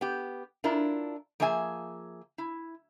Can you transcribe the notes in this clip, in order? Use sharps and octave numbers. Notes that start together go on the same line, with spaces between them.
B3 G4
D4 E4 F4 A#4
F3 A#3 G#4 E5 G#5
E4